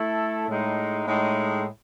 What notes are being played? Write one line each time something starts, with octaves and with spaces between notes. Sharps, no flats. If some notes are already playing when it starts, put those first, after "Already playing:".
Already playing: A3 E4 A4
A2 G#3 D#4
A2 G#3 D#4